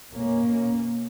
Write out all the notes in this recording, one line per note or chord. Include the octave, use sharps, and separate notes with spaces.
B2 A#3 C#4